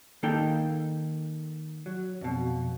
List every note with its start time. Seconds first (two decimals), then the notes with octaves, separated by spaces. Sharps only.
0.23 D#3 A#3 D#4 A4 G5
1.86 F#3
2.21 F2 B2